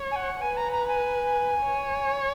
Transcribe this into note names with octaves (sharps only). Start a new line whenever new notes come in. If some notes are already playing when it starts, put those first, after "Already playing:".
Already playing: C#5
G#5
F#5
B4 G#5
A#5
A#5
G#5
C#5